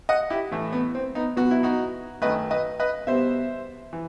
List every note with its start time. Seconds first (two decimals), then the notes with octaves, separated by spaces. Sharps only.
0.09 D#5 F#5
0.30 E4 G4
0.51 A2 E3 A3
0.73 B3
0.95 C4
1.15 B3 D#4
1.36 B2 F#3 B3 F#4
1.51 E4
1.63 D#4 F#4
2.22 F#2 D#3 A3 B4 D#5
2.51 B4 D#5
2.80 B4 D#5
3.07 B2 G3 B3 C5 E5
3.93 E3